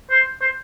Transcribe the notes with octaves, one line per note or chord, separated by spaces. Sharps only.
C5
C5